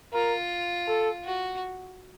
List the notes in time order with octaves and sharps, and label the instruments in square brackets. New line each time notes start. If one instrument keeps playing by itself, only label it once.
[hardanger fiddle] F4 [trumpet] A#4
[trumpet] A4
[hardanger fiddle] F#4